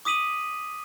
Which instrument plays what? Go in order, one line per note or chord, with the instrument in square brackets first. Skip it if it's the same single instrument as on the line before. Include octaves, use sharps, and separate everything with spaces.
[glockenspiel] D6 D#6 B6 D#7 F#7